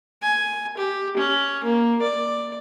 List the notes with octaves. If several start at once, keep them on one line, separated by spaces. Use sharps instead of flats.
G#5
G4
C#4
A#3
D5